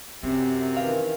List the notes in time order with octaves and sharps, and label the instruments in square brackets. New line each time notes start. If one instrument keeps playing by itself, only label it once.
[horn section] F#2 C3 [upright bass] C4
[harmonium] D#3 E3 [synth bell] F5